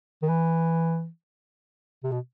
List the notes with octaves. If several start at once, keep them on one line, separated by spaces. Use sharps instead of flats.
D#3
E3
C3
B2